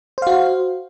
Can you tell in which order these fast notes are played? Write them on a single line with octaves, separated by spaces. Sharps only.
C5 F5 F#4